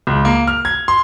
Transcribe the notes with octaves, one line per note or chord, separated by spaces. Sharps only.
C#2
A#3
F6
G#6
C6